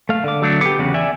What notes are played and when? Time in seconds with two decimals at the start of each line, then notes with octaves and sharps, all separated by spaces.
0.09 A3 F5
0.24 D3 D6
0.42 F#3 A3 D4
0.61 B3 G4 D6
0.79 E2 C#3 F#4
0.94 D5 E5 G#5